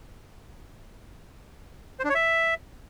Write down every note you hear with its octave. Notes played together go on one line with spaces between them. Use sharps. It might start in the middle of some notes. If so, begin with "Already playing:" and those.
C5
D4
C#5
E5